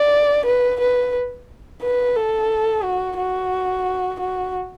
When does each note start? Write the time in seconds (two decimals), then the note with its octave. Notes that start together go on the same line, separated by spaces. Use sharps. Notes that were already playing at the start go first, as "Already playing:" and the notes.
Already playing: D5
0.46 B4
0.80 B4
1.82 B4
2.16 A4
2.84 F#4
3.17 F#4
4.20 F#4